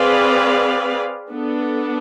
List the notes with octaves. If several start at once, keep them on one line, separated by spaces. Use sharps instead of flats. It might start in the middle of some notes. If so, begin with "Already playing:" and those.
Already playing: C4 G#4 B4 D5 F5
B3 D4 A4